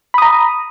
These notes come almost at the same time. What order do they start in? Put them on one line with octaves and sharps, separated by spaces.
B5 D#6 A#5